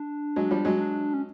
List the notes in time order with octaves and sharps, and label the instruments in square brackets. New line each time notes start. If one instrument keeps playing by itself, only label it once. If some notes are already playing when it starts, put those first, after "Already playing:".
Already playing: [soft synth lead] D4
[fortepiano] F#3 G#3
F3 G3
F#3 G#3
[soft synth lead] D4
C#4